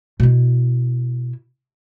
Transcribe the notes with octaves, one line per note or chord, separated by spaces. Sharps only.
B2 E4